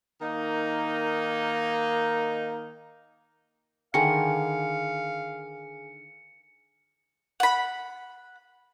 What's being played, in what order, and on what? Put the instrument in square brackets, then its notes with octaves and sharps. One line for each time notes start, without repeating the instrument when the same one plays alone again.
[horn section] D#3 A#3 D#4
[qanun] D3 D#3 [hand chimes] G#4 G#5 [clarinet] F5 [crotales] C#7
[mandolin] F#5 B5